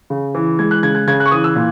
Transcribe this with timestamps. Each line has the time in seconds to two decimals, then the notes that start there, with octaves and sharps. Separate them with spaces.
0.10 C#3
0.35 E3
0.59 G#3 G#6
0.71 F#6
0.83 C#3 G#6
0.95 G#6
1.07 C#3 G#6
1.20 F#6
1.26 C#6
1.31 E3 D#6
1.44 E6
1.55 A#2